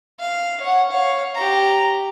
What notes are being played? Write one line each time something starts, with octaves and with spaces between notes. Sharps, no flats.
F5
C#5 F#5
C#5 F5
G4 A#5